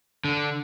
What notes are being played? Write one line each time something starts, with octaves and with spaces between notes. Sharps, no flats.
D3